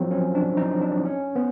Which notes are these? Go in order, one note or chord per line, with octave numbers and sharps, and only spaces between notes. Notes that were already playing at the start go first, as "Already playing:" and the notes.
Already playing: F3 F#3 C4
C#4
D4
D#4
D4
C#4
B3